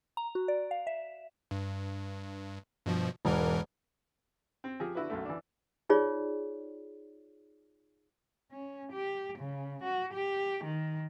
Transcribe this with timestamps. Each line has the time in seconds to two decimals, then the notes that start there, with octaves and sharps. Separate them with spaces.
0.17 A#5
0.35 F#4
0.48 D5
0.71 F5
0.87 E5
1.51 G2
2.86 G2 B2 F3
3.25 E1 G#2 E3 A#4
4.64 C4
4.80 F3 G4 G#4
4.95 D3 E4 F#4 B4
5.10 B1 F#2 A3
5.25 E3 D4
5.90 D#4 F4 G#4 C#5 D5
8.52 C#4
8.92 G4
9.39 C#3
9.83 F#4
10.14 G4
10.64 D#3